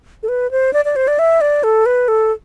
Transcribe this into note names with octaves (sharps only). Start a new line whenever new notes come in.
A4
B4
C5
D5
D5
C5
D5
E5
D5
A4
B4
A4